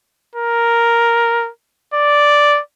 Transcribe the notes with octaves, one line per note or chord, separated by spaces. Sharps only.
A#4
D5